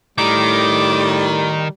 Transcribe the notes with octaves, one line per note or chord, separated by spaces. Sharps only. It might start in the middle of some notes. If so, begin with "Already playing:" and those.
A2 D#3 G3 D6